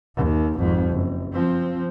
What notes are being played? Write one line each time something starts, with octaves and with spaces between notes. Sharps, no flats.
D#2
G#1 F2
F#1
F3 C4